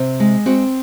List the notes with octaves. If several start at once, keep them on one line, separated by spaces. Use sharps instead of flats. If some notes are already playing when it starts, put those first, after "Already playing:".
Already playing: C3
G#3
C4 F#4